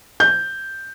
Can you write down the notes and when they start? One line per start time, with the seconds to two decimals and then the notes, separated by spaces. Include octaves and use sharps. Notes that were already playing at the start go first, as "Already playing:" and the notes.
0.20 G6